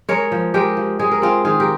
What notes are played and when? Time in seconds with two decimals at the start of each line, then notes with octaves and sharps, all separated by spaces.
0.09 G#3 A#4 C#5
0.32 F3
0.54 G#3 G4 A#4
0.77 F3
0.99 G#3 G#4
1.11 A#4
1.22 C4 F4 G#4
1.44 D#3 F4 G#4
1.60 G4 A#4